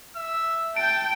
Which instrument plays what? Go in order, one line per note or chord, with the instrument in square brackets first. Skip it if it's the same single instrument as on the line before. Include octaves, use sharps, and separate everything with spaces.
[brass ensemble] E5 [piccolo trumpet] E6
[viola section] G5 [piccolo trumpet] A5 [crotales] D7